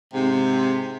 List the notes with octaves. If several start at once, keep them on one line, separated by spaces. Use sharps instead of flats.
G#2 C3